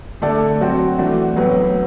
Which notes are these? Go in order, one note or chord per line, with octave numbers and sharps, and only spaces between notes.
D3 A3 D4 A4 D5
F#3 C4 F#4
E3 A3 D4 F#4
A2 F#3 B3 F#4 B4